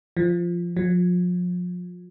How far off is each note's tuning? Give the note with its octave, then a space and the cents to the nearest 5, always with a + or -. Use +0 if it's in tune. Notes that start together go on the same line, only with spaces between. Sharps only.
F3 -10
F3 +35